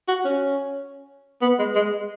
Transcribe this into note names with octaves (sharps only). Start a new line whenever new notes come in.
F#4
C#4
B3
G#3
G#3